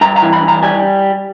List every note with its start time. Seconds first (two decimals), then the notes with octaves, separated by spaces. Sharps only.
0.01 G2 A#5
0.16 A#5
0.22 E3
0.33 B5
0.43 G2
0.48 A#5
0.63 G3 G#5